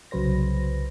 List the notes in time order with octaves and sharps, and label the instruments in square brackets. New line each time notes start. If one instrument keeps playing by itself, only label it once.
[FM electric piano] C2 C#3 F#3 B4 C5 A#6